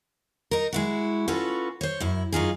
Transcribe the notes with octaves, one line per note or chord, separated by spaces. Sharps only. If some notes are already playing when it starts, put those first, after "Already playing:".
D#4 A#4
G#3 E4 F#4
C#4 F4 F#4 A4 B4
C5 C#5
F#2 E4
F#2 D#4 F4 G#4